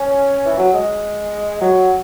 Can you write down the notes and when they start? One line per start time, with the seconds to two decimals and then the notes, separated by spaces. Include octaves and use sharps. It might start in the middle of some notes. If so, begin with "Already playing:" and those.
Already playing: C#4
0.45 E3
0.58 F#3
0.72 G#3
1.60 F#3